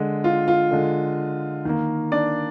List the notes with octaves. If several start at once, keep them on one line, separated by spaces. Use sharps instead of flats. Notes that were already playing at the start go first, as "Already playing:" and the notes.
Already playing: D3 G#3
F4
F4
D3 G#3
D#3 A#3
D4 D5